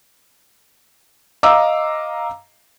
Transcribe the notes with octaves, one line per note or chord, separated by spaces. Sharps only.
D#5 F5 A#5 D6 E6